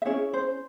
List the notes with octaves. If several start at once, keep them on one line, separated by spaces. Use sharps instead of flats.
E5
C#4 E4 G#4 C#5
C5